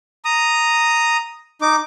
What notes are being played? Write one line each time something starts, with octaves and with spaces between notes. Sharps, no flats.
A#5 D#6
D#4 D6